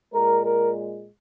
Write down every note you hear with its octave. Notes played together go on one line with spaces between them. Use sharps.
A#2 G#3 A#4
A#4